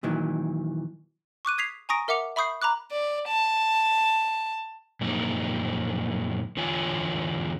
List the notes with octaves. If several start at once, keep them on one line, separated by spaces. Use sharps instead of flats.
A#2 D#3 E3 F#3
C#6 D6 F#6 D#7
D#6 G#6 B6 C7 F7
G#5 A#5 C#6 D#6 A#6 D7
A#4 E5 F#5 D6 C#7 F7
E5 B5 C#6 D#6 G6 C7
A#5 B5 D6 F#6
D5
A5
F#2 A#2 F3 A#3 C4 D#4
E2 D3 E3 F4 C#5 G#5